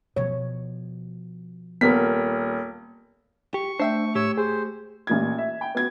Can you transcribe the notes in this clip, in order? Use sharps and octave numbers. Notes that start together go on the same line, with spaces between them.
B2 F3 C#5
D#1 B3 A#4 B6
G4 C#6
A3 D4 C5 E5 G5
A2 G4 C#5 E6
G#4 C5
A1 A#2 G#6
E5
G5
B3 F#4 G#6